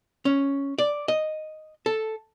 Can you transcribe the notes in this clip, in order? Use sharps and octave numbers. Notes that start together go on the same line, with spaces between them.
C#4
D5
D#5
A4